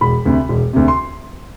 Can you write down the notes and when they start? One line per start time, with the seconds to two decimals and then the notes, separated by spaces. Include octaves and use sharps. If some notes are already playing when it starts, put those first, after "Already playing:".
0.01 E1 B5
0.26 D2 C3
0.49 E1
0.73 D2 C3
0.88 C6